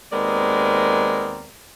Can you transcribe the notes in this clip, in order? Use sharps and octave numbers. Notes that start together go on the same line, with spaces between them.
D#2 G#3 B3 C4 A#4 D5